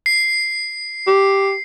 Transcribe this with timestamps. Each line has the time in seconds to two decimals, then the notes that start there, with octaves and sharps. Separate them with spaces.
0.06 C7
1.08 G4